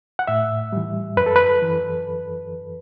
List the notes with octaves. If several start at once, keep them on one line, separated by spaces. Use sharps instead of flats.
F#5
A2 E5
E3 G3
F#2 B4
A4
B4
E3